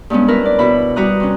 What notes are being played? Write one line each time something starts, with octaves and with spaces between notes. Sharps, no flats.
G2 G#3 B3 C#4
E4 A#4 B4
D5
B2 E4 B5
G3 F#4 B4 A#5 D#6 F#6
C3 C#4